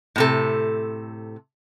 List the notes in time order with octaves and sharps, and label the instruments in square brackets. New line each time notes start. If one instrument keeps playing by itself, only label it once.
[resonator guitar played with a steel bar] A2 C3 A4